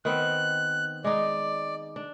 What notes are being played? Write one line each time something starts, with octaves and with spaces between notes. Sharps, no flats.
D#3 B3 C4 F#6
G#3 D#4 D5
D4